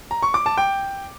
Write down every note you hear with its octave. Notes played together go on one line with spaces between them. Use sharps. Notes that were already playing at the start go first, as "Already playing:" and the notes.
A#5
C#6
D6
A5
G5